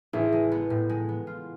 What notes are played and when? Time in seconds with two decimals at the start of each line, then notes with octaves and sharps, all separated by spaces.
0.13 A1 E4 G#4
0.32 G#3
0.52 B3
0.70 A2
0.89 G#3
1.09 B3
1.27 F4